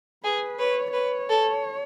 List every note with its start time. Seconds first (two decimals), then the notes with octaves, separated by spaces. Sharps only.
0.24 G#4 B4
0.59 B4 C#5
0.93 B4 C#5
1.29 A4